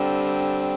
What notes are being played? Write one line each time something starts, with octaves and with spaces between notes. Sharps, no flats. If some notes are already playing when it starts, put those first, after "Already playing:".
Already playing: D3 G3 C4